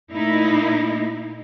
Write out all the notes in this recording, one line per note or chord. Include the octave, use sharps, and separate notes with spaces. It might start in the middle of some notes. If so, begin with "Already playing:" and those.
A#2 A3 D#4 E4